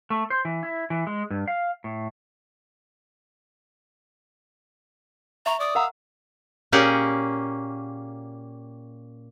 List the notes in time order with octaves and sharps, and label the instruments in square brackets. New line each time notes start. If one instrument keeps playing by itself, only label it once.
[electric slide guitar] A3
C5
E3
E4
E3
G#3
G2
F5
A2
[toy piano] E5 C#6 [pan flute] A#5
[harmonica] D5 [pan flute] D#6
[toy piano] A#4 F#5 A#5 [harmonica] F5 E6
[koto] A#2 A#3 C#4 G4 G#4 F#5